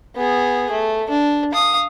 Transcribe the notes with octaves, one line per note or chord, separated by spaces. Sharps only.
B3 G#4
A3
D4
F5 D#6